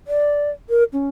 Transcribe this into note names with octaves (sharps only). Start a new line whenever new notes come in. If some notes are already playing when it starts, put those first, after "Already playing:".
D5
A#4
C#4